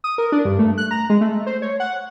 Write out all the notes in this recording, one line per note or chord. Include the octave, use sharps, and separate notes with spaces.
D#6
A#4
D4
G2
A3
F#6
A#5
G#3
A3
C5
C#5
F#5